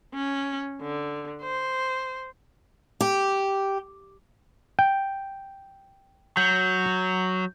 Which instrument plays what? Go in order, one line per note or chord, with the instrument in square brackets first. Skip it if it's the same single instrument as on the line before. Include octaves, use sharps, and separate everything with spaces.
[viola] C#4
D3
C5
[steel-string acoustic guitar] G4
[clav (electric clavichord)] G5
[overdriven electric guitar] F#3 [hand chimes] G6